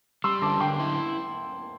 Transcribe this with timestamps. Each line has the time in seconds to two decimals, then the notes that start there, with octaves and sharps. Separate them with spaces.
0.24 G3 C6 E6
0.42 D3 A5 D6
0.60 D3 G5 C6
0.79 E4